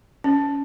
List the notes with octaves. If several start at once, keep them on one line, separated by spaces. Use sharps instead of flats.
C#4